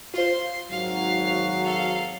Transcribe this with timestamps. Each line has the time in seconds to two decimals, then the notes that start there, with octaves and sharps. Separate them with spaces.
0.14 F4 C5 C6
0.70 G#1 F#3 F5
1.64 A4 F5